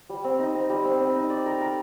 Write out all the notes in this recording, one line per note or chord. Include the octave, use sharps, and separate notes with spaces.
G3
C4
D#4
C4
G3
C4
C4
D#4
D5
A#4
A#4